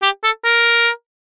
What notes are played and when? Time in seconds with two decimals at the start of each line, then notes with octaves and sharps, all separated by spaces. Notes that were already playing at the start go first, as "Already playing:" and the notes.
0.03 G4
0.24 A4
0.45 A#4